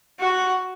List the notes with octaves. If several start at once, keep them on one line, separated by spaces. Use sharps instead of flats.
F#4